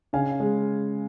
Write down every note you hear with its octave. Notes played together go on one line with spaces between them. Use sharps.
C#3 F5 G#5
G#3